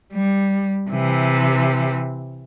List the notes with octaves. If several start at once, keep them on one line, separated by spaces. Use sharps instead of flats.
G3
C3 E3